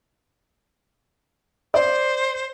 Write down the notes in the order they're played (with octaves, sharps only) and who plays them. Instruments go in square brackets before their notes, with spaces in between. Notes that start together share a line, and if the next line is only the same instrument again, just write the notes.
[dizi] C5 [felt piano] D5